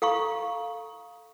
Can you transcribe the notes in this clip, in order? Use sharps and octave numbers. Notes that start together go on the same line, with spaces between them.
A4 F5 A#5 C#6